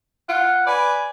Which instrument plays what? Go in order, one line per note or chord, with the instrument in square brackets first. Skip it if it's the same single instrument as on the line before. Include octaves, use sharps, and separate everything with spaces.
[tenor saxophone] F4 [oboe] F#5
[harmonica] B4 [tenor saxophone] D5 [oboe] G#5